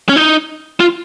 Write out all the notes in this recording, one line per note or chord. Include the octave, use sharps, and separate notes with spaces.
C#4
D#4
F4